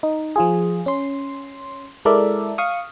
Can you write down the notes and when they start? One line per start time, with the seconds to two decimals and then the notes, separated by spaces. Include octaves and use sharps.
0.03 D#4
0.36 F3 F4 G#4
0.86 C#4 C6
2.05 G#3 E4 A4 A#4 D5 E5
2.58 F5 C#6 D#6